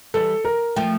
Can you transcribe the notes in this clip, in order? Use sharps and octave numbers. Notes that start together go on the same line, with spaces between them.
E3 G3 A4
A#4
F3 A3 G5